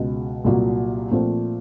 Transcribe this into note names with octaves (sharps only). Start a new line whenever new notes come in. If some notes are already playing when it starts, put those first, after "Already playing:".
Already playing: C#2 B2 G#3
C2 A#2 F#3
A#2 F3 A3 C4 F4